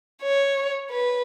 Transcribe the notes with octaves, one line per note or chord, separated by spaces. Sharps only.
C#5
B4